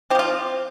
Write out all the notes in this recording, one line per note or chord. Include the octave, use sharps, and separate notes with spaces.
F3 C4 F4 G4